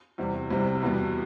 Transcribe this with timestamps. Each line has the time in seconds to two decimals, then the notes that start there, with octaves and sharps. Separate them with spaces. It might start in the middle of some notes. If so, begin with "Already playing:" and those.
0.18 E2 C3 G3
0.50 C2 C3 G3
0.82 E2 B2 G3 B3